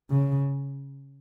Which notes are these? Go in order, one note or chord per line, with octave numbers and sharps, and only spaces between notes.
C#3